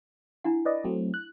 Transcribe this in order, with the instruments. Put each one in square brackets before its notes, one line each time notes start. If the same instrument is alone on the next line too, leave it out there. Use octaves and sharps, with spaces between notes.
[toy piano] D4 E4 F#5
[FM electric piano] B4 D5 D#5
F#3 A3 C4
F#6